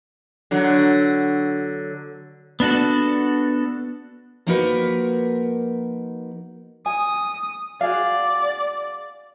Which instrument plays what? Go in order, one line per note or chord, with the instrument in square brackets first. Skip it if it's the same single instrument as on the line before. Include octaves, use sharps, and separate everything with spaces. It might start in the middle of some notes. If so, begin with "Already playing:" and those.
[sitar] D3 F#3
[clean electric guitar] B3 D4 F#4 A4
[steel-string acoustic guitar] F3 A#3 D#4 F#4 A#4 B4
[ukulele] G#5 [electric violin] D#6
[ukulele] F#4 G#4 F5 [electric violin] D5